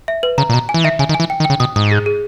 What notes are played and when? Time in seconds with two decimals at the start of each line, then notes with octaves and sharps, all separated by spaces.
0.08 E5
0.23 B4
0.38 C#3 A#5
0.50 A#2
0.53 B2 A#5
0.69 G#5
0.74 E3
0.84 D#3 E5
0.99 C#3 G#5
1.09 D#3
1.14 G#5
1.20 E3
1.30 G5
1.40 D#3
1.45 G5
1.50 C#3
1.60 B2 D#6
1.76 G#2 D#6
1.91 G#4
2.06 G#4